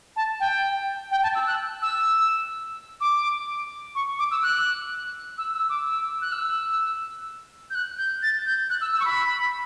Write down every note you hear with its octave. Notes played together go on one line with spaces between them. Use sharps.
A5
G5
G5
A5
E6
F#6
E6
D6
C#6
D6
E6
F#6
E6
E6
D6
E6
F#6
E6
G6
F#6
G6
A6
G6
F#6
E6
E6
C#6
B5